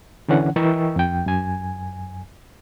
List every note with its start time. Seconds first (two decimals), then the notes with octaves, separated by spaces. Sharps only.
0.28 D3 E3 C#4 F#5
0.56 E3 A#4 D#5 G5 C#6 E6
0.96 F2 G5
1.26 F#2 G#5